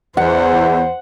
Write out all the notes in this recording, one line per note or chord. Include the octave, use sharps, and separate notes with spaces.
E2 C5 F#5